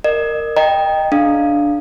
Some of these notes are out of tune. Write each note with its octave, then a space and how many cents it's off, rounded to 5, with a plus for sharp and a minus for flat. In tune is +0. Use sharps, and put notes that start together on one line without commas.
A#4 -10 D#5 -40
D#5 -5 G5 +10 A#5 -10
D4 +0 G#4 +45 F5 +0